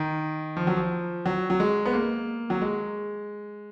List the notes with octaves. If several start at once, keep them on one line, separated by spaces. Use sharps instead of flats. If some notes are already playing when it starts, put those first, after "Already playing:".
Already playing: D#3
F3
F#3
F3
F#3
F#3
G#3
B3
A#3
F#3
G#3